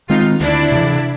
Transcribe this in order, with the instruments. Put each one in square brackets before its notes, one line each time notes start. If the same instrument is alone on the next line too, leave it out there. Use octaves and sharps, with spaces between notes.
[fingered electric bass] D#3 G#3 C4 [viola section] D#4 F4
[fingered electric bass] D2 [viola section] D4 E4
[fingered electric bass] C3 E3